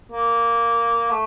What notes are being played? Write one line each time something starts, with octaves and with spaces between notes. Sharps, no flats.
A#3
A3